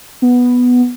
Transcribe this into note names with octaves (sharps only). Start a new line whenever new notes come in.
B3